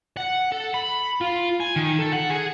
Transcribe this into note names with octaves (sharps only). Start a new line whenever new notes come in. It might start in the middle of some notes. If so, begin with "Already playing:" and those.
F#5
A4
B5
F4
G#5
D#3
A4
F#5
G#4